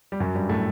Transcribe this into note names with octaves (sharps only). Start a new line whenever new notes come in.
G3
F#2 F#3
G2 G3
A2 A3